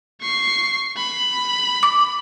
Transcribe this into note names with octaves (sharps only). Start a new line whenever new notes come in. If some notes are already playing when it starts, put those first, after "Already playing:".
C#6 C7
B5
D6